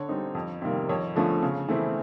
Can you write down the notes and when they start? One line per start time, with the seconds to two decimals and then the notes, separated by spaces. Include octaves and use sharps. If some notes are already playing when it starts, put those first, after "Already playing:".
Already playing: D3 C#5
0.09 G3 C4 D#4
0.35 F2
0.62 C3 D#3 G3 A#3
0.89 F2 C#5
1.16 D3 F3 A3 C#4
1.43 C#3
1.68 E3 A3 C4 E4